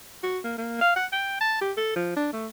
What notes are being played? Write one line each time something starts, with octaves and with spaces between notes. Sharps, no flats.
F#4
A#3
A#3
F5
F#5
G5
A5
G4
A4
F3
D4
A3